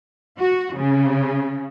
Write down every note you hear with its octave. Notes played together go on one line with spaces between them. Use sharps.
F#4
C#3